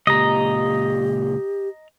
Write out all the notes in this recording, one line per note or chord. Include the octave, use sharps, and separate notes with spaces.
C#2 A#2 G4 D#5 A#5